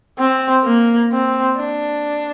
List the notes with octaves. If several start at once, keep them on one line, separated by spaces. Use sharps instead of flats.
C4
A#3
C4
D4